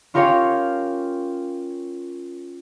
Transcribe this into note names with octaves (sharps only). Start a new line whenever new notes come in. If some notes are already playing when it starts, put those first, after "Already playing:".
C#4 F4 G4 A#4 C#5 F5